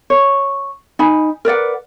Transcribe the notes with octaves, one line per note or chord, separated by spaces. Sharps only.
C#5
D#4 G#5 B5
A#4 B4 D5 F#5